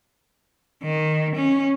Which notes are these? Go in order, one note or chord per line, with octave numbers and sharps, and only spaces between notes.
D#3
C#4